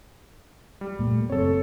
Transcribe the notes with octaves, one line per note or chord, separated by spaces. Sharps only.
G3
A#2 A3 A#3
F#1 C4 A4 C#5